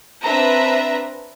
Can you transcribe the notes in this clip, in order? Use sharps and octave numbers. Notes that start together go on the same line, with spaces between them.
C4 D4 B4 E5 A#5